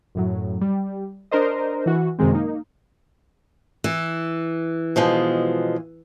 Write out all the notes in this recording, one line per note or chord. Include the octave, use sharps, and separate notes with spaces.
F#2 A2 F#3
G3
D4 A#4 C5 D#5
E3 F#4
F#2 C3 D#3 G#3 C4
A#3 D#4
E3
B2 F3 G#3